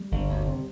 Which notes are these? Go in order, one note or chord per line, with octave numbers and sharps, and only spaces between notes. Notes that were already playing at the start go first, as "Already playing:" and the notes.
Already playing: G3
G1
D2
C3